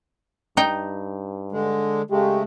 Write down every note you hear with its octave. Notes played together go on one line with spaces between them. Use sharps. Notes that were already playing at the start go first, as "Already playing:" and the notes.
G2 D#4 G5
D3 G#3
C#3 G#3 A3 G4